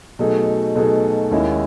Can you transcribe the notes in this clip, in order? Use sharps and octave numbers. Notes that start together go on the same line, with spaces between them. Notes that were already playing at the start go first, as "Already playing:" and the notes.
B2 F#3 A3 D#4 G#4
B2 F#3 A3 D#4 G#4
D#2 D#3 G#3 C#4 E4